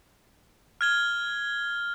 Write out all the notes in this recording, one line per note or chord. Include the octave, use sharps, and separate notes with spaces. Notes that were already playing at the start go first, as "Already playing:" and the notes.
F6 G#6 G7